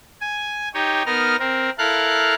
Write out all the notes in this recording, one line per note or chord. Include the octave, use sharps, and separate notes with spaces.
G#5
D#4 G4 C#5
B3 D#4 A#4 F6
C4 A#4
E4 A4 A#4 F5 F#6